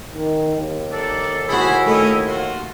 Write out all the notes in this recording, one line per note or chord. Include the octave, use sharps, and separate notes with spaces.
D#3
D#2
D4 D#4 A4 D5
E4 F#4 G#4 C5 B5
A3 C#4 D#5
F4 F#4 C6